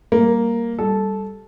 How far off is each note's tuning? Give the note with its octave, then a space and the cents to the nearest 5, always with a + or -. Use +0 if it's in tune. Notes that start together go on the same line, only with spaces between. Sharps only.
G3 +0 A#3 +0
G3 +0 A4 -10